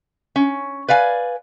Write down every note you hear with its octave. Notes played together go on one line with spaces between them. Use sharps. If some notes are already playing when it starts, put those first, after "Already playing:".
C#4
B4 D5 F5 G#5